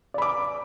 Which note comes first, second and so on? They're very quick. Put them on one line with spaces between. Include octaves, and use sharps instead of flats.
D5 B5 D6